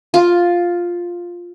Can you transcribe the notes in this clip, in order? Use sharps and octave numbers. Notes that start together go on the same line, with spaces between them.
F4